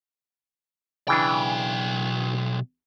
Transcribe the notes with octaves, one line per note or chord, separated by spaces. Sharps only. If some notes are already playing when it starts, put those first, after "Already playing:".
B1 C#3 E3 D4 G5